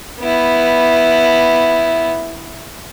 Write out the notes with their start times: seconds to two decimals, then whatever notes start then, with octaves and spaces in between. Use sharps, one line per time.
0.21 B3 E4